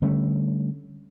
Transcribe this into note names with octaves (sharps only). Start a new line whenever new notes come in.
D3 G3 A3 C#4